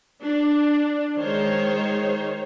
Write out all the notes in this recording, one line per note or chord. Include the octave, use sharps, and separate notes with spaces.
D4
D#3 G#3 C5 C#5